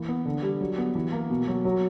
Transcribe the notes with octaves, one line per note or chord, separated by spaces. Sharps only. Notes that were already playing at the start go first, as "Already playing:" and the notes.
Already playing: E3 A#3
B3
D3
G3
F#3
B3
E3
A#3
B2
F#3
F#3